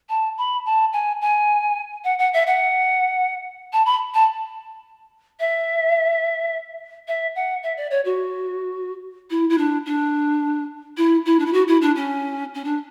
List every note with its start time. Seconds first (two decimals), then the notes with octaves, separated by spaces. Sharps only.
0.09 A5
0.38 B5
0.66 A5
0.93 G#5
1.21 G#5
2.04 F#5
2.19 F#5
2.34 E5
2.47 F#5
3.73 A5
3.86 B5
4.14 A5
5.40 E5
7.08 E5
7.35 F#5
7.63 E5
7.77 D5
7.91 C#5
8.05 F#4
9.30 E4
9.50 E4
9.58 D4
9.86 D4
10.97 E4
11.26 E4
11.39 D4
11.46 E4
11.53 F#4
11.68 E4
11.82 D4
11.96 C#4
12.55 C#4
12.65 D4